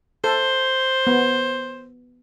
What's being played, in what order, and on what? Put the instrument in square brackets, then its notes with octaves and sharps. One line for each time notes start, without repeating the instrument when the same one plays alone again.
[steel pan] A4 [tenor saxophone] C5
[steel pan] B3